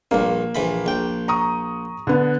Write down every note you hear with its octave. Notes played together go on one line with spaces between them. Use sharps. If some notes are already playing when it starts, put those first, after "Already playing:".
A#1 G2 A#3
A#1 E3 B5
A#1 G5
A#5 C#6 D#6
D3 B3